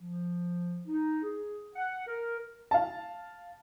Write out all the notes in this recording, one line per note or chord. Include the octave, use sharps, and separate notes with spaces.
F3
D#4
G#4
F#5
A#4
F5 A5